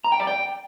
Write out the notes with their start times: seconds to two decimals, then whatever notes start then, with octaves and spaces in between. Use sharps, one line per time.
0.04 A#5
0.12 G5
0.20 D5
0.27 G5